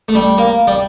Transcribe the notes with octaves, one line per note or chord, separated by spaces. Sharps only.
A3
G3
A#3
G3